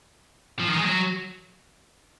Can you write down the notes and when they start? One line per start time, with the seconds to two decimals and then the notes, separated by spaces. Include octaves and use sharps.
0.59 F3
0.68 D#3
0.76 G#3
0.85 F#3